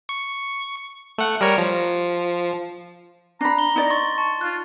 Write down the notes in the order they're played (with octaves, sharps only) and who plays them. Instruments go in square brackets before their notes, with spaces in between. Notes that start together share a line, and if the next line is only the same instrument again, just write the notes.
[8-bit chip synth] C#6
A3 F#5 C#7
G3 A#4 C#5
F3
[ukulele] D4 B5 [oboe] A#5
[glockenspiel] G7
[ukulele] D#4 D5
[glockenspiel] C6 C#6 A6
[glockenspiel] A5 [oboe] C#6
[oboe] F4 [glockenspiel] F#6